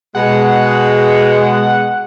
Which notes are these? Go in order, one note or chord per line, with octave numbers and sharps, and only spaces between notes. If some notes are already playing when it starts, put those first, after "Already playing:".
B2 G#3 F#5